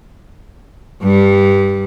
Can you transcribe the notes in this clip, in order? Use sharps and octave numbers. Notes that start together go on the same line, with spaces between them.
G2 G3